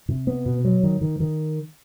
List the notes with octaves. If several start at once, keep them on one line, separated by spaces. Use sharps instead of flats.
C3
B3
B2
F#3
D#3
D#3
D#3